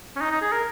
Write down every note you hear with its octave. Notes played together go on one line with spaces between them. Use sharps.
C#4
D#4
D#4
G#4
A#4